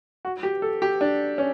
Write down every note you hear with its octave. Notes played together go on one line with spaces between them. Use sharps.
F#4
G4
A4
G4
D4
C#4